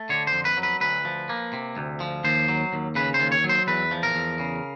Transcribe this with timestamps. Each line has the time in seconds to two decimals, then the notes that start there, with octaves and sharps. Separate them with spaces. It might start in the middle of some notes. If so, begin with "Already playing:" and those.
Already playing: A3
0.09 D3 C#5
0.27 C5
0.33 F2
0.45 B4
0.57 F#3
0.63 B4
0.81 D2 B4
1.05 F3
1.29 A#3
1.53 C3
1.77 D2
2.00 F3
2.24 D#2 C5
2.48 F#3
2.73 D#2
2.95 C#3 B4
3.14 C5
3.20 D#2
3.32 C#5
3.44 F#3
3.49 C5
3.67 E2 B4
3.91 F3
4.03 A#4
4.15 E2
4.39 C#3